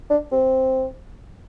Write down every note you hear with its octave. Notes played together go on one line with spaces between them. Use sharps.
D4
C4